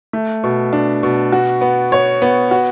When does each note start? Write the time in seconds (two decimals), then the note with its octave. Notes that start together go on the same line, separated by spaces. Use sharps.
0.13 A3
0.44 B2
0.73 D4
1.03 B2
1.32 F#4
1.61 B3
1.92 C#5
2.22 B3
2.51 F#4